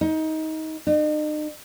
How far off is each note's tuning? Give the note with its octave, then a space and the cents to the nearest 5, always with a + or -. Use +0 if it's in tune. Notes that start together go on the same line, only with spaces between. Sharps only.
D#4 +20
D#4 -40